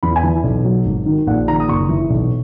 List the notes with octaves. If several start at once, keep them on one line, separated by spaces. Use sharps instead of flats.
E2 B5
G#5
E3
B1
F#3
G#1
D#3
A#1 F#5
D#3 A#5
D#6
F#1 C#6
E3
B1